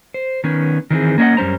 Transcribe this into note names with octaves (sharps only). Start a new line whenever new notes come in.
C5
D#3 B3 C#4
D#3 E3 C4 G#4
A#3 C#4 D4 E4 D#5 F#5
F#2 G3 C#4 C5 A#5